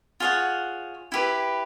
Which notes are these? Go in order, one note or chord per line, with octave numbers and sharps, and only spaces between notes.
F4 G#4 C#5 F#5
E4 G4 B4